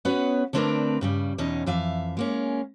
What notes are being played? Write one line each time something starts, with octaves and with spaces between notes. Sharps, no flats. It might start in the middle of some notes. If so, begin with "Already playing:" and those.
B3 C#4 F#4 B4 C#5
D3 A3 C4 D4 A#4 B4
G2 C#3 G3
E2 B2 C#4 D#4
F2 E3 E5 F5
G#3 A#3 C#4